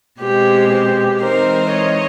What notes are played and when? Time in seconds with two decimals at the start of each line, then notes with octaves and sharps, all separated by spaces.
0.20 B2 G#3 C4 G4
0.72 G4
1.22 E3 G#3 C4 D#4 A#4 C5
1.73 C#5 D#5